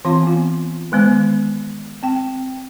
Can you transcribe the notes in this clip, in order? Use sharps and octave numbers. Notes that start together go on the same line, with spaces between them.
E3 C4 F4 F5 C6
B3 F4
D#3 G#3 B3 C5
C4 G5